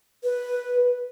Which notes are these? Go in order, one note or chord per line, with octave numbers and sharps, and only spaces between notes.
B4